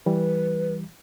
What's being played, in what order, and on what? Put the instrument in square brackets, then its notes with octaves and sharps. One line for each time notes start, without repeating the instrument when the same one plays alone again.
[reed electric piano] E3 G3 [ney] B4